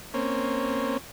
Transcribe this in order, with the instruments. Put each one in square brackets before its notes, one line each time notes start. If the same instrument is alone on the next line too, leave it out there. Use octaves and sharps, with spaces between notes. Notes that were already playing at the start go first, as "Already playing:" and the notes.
[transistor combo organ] A#3 C4 C#4